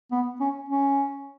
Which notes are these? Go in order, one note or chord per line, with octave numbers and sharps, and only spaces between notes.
B3
C#4
C#4